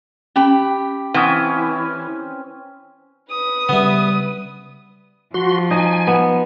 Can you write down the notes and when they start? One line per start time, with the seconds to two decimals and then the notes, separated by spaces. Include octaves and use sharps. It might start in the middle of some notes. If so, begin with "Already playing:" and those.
0.36 C#4 G4 A5 B5
1.14 E3 C4 C#4 F#5 D#6
3.31 B4 D#6
3.69 C#3 G3 B3 E5
5.34 F3 F#4 C6
5.71 D#4 G#5
6.07 B3